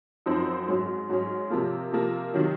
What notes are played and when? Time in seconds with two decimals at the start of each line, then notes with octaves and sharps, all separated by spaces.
0.26 F#2 F3 C4 D#4
0.67 G#2 F#3 C#4
1.09 G#2 F#3 C#4
1.50 C3 F3 A#3
1.93 C3 F3 A#3
2.34 C3 D#3 F#3